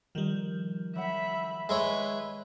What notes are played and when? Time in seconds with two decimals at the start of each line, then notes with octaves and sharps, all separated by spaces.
0.15 D#3 F3 G3
0.95 F#3 E5 F#5 B5
1.69 G#3 E4 B4 C#5